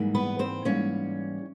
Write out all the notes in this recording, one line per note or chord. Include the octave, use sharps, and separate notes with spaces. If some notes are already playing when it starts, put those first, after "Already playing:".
Already playing: G#2 E3 G3 A#3
B3 B4
C4 C5
G#2 E3 G3 A#3 C#4 C#5